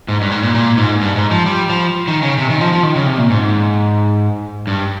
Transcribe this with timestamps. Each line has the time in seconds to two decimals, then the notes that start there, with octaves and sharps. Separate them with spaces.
0.08 G#2
0.21 G2
0.31 G#2
0.43 A#2
0.55 A#2
0.77 G#2
1.01 G2
1.16 G#2
1.31 F3
1.46 G3
1.69 F3
2.08 D#3
2.22 C#3
2.38 C3
2.50 D#3
2.61 F3
2.73 F3
2.83 D#3
2.95 C#3
3.07 C3
3.18 A#2
3.30 G#2
4.67 G2